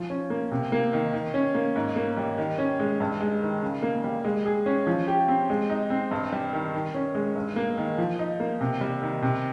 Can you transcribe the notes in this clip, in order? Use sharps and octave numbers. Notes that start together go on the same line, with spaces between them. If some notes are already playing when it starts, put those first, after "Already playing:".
Already playing: F3
C#4
A#3
C3
A#3
D#3
D#3
C#4
A#3
G#2
A#3
G3
D#3
C#4
G#3
G2
G#3
D#3
C#3
A#3
G3
G#3
G#4
C#4
F3
G4
C4
G#3
D#4
C4
G2
G3
D#3
D#3
C#4
G#3
G2
A#3
D#3
F3
D#4
A#3
C3
G3
D#3
C3